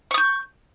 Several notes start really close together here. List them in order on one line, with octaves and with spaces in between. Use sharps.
C#6 D#6 G6